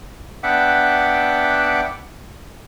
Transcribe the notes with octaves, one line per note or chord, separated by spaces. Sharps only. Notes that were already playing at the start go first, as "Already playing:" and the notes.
B3 D4 E5 F#5 G5 D6